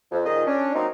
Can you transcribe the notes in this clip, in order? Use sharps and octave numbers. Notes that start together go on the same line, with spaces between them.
F2
A#2 D#3 D#4 G#4 D#5
C#4 D4
F#3 A#3 C4 D#4